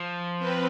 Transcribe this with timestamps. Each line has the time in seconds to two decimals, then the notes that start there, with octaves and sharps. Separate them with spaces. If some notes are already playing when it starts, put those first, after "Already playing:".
Already playing: F3
0.39 C4 B4